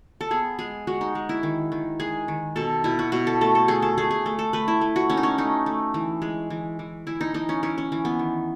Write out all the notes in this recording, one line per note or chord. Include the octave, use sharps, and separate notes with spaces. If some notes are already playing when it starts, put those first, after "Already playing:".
A4
B3 G#4
G#3 G#4
G#3 F#4
D#4
G#3
E4
D#3
D#3
G#3 G#4
D#3
B2 A4
B2 E4
F#4
B2 F#4
A4
A3 A4
A4
A3 G#4
A4
A3 G#4
G#4
A3
A4
A3 B4
E4
A3
F#4
A3 C#4
D#4
C#4
A3 D#4
A3
E3
G#3
E3
E3
E3 E4
D#4
E3 D#4
C#4
E3 C#4
C#4
E3
B3
D#3